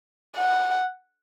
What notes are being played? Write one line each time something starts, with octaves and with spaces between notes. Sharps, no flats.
F#5